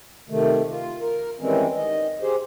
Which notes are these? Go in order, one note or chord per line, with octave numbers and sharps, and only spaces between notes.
C3 D#3 A3
F4
A#4
D#3 E3 G3 G#3 C4 C#4
D#3 D#5
G4 G#4 C5